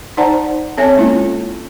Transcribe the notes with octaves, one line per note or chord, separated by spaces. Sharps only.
D#4 C5 D5 F#5 A5 A#5
C4 A4 C#5 E5 G#5 A5
G#3 A#3 C#4 E4 F4